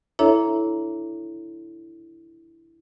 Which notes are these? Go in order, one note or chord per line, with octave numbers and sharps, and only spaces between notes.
D4 E4 A4 C#5 E5 A#5